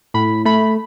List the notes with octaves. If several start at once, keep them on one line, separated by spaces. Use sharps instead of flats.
A2 B5
A3 B5